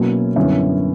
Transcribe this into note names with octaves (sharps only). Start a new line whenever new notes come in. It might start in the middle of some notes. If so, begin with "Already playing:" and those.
Already playing: B2 F#3 A#3 C#4 E4
F#2 D3 G3 B3 C#4 E4